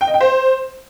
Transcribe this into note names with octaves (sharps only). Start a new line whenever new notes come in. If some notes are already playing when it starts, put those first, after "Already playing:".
G5
D#5
G5
C5